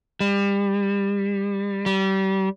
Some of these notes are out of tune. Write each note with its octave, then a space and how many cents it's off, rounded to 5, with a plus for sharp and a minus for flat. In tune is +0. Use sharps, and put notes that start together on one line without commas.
G3 +30
G3 -30